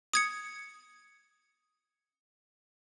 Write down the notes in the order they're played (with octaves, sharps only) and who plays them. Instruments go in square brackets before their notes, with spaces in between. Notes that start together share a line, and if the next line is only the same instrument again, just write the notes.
[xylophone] D#6 G#6 C#7